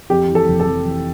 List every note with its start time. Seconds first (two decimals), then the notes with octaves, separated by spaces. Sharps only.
0.10 F2 G4
0.29 E3
0.35 A4
0.47 F1
0.60 A4
0.66 F2
0.85 E3